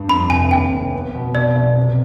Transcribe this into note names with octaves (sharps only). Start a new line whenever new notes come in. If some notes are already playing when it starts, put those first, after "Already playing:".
Already playing: G2
F2 B5
F1 G#5
D#2 G5
F1
B3
B2
B2 D5
B1
C3